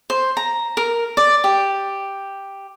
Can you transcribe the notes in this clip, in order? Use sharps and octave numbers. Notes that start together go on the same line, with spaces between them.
C5
A#5
A#4
D5
G4